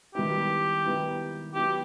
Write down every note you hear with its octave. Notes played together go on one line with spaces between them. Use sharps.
D#3 G3 B3 E4 G4
D#3 G3 B3 E4
F#3 B3 E4 G4